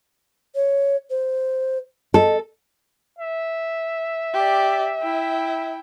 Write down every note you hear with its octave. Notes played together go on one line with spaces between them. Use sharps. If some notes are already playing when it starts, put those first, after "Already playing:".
C#5
C5
A4 D#5
E5
G4 D5
E4 G5